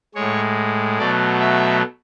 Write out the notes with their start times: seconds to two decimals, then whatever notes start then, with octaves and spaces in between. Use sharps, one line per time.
0.14 A2 G#3 C#5
0.98 B2 F#3 A3 D5
1.40 E5